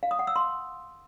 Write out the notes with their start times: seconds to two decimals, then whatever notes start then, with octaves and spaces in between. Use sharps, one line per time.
0.03 F5
0.11 D#6
0.19 F#5
0.27 E6
0.36 C6